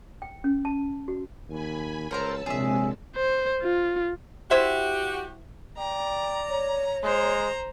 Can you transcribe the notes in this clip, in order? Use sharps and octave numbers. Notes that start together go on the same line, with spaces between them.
G5
C#4
A5
F#4
D#2 G#5 B5
C#2 A#4 C5 C#5 A5 A#5 E6
A#1 C3 G#3 C4 G#4 C#5 E5 G#5
C5
F4
E4 F#4 G4 C5 E5
D5 G5 A#5
C#5
G#3 C5 A#5